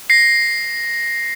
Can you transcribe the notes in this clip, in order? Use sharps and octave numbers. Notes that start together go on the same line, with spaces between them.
A#6 C7